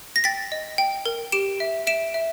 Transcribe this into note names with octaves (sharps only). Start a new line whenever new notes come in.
A#6
G5 A6 B6
D#5
G5
A#4
G4 D7 E7
E5
E5 D7 E7
E5